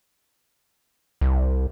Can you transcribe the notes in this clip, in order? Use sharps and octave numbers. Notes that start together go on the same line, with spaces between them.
C2